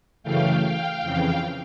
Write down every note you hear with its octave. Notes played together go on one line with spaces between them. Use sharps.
F#2 C#3 E3 A3 F5 G5
F5 G5
F2 C#3 E3